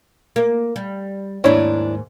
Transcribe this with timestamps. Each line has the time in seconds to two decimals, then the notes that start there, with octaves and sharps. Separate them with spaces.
0.36 A#3
0.76 G3
1.44 D#2 G#2 D4 E4 C#5